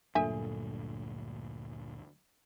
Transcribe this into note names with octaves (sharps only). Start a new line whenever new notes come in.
D2 G2 A#2 F#3 D4 A4 E5 G#5